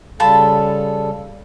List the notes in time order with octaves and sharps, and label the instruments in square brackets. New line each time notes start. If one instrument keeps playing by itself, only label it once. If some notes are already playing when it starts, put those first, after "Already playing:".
[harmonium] C#3 G3 A4 [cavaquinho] F4 A5 B5